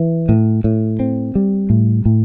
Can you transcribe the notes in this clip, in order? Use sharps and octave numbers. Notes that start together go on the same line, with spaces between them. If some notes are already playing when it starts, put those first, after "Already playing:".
Already playing: E3
A2
A2
C4
G3
A2
A2